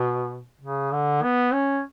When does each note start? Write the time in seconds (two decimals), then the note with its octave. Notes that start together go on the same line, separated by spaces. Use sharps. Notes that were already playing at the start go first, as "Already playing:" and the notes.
Already playing: B2
0.61 C#3
0.92 D3
1.23 B3
1.53 C#4